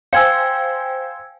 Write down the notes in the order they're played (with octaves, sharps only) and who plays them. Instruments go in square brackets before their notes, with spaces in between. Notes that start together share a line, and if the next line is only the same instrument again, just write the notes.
[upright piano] C5 [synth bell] F5 G5 G#5 [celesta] E6 G#6 C#7